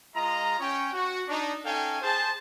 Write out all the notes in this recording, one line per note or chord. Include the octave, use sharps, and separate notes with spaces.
G#3 F4 D#5 A#5
C#4 C#5 G5
F#4
D4 D#4
C#4 D#4 A4 F5 G5 G#5
G#4 C5 A5